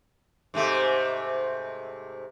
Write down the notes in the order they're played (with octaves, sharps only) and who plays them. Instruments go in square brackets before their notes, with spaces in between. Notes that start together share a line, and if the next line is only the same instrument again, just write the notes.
[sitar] G#2 C3 A3